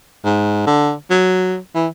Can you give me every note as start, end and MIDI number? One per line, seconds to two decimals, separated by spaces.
0.25 0.66 44
0.67 0.93 50
1.10 1.57 54
1.75 1.87 52